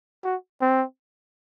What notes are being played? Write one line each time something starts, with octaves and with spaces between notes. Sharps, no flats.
F#4
C4